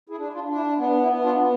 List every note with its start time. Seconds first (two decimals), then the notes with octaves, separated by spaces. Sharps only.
0.09 E4 G#4
0.18 D4
0.32 D4 F4
0.48 D4
0.55 E4
0.78 B3 D4
1.01 E4
1.08 B3
1.23 D4 F4
1.38 B3